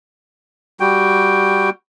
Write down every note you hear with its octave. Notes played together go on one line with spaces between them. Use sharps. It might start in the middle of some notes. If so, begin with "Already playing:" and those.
G3 F#4 G5